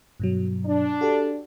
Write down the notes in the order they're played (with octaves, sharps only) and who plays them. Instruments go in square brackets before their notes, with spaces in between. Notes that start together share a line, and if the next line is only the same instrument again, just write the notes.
[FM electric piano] G2 B2 F#3
[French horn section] D4
[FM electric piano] F#4 G4 A4